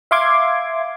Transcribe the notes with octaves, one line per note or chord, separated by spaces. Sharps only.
E5 F5 C6 D6 G#6